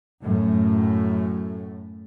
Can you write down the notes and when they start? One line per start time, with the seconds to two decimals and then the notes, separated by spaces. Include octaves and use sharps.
0.22 F#2 A2 A3